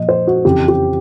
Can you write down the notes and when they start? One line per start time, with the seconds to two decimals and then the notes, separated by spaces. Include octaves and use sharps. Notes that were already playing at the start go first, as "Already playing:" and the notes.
Already playing: A#2 F3 D#5
0.09 C5
0.27 F#4
0.44 F2 C#3 E3 G4
0.68 G4